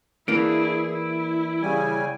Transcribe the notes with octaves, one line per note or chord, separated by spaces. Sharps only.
E3 A#3 D4 E4 G#4 D7
E4
C#3 G3 G#5